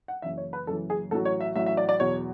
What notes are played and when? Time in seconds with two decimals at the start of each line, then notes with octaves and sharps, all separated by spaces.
0.08 F#5
0.22 F#1 F#2 E3 E5
0.38 C#5
0.53 B4
0.67 F#1 F#2 E3 A4
0.90 G#4
1.11 A1 A2 F#3 A4
1.25 C#5
1.41 E5
1.55 A1 A2 F#3 E5
1.66 E5
1.77 D5
1.89 D5
2.00 E2 B2 F#3 C#5